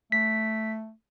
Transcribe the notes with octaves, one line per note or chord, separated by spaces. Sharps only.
A3 B6